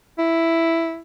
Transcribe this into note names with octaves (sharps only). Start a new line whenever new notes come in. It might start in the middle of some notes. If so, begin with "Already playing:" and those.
E4